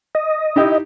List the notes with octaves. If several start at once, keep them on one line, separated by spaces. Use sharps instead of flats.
D#5
D#4 E4 G4